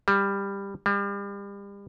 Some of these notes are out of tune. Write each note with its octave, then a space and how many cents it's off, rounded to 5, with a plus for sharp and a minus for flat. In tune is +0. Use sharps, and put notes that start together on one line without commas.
G3 +15
G3 +35